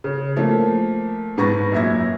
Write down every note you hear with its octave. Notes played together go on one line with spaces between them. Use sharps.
C#3
F3 A3 A#3
G#2 B4 C#6 A6 A#6
F#2 A#2 E5 G#6 A#6